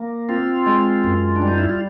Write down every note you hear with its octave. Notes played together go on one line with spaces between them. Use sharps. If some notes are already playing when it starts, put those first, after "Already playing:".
Already playing: A#3
C4 F4
G#3
F#2
D4
G3
D#4
E4
F4